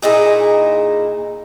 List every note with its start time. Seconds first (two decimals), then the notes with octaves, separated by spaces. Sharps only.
0.02 A#2 D#4 E4 G#4